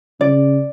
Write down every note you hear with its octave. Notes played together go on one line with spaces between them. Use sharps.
C#3 D5